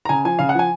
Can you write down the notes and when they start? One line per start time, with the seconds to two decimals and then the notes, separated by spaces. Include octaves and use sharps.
0.05 A#5
0.09 C#3 G#5
0.25 F3 G#5
0.39 C#3 F5
0.49 F#5
0.55 F3 G#5